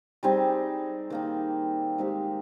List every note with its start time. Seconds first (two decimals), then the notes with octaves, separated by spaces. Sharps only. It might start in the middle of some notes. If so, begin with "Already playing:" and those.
0.23 G3 C4 D#4 G#4
1.10 D#3 A#3 D#4
1.98 G#3 C4 D#4 G4